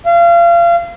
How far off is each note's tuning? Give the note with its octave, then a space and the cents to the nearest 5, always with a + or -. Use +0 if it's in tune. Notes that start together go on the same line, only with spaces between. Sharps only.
F5 -30